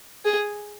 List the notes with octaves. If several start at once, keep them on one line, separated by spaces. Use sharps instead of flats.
G#4